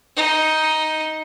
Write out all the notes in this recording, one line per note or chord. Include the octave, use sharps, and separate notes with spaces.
D#4